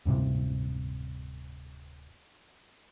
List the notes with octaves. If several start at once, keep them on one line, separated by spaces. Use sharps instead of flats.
D1 G2 C3